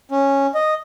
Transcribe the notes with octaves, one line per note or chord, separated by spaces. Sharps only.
C#4
D#5